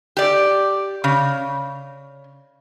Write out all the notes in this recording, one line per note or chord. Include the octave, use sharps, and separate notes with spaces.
G4 D5
C#3